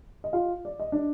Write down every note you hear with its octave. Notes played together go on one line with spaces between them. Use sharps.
D#5
F4 F5
D5
D#5
D4 D5